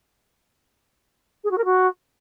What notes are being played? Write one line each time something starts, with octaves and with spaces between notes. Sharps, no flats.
G#4
F#4
A#4
F#4